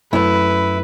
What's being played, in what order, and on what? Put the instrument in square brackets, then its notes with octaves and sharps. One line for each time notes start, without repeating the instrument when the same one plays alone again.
[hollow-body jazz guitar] F#2 A3 [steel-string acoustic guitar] E4 [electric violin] B4